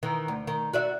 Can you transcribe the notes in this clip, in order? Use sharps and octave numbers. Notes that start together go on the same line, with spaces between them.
D#3 E3
D2
D#3
F#4 D5 E5